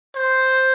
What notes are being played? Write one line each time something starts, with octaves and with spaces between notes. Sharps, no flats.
C5